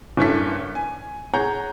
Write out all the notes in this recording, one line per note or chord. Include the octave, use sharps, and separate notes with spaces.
F#1 G2 C#4 E4 A4 B6
G#5
G#4 C#5 F#5 A#5 G6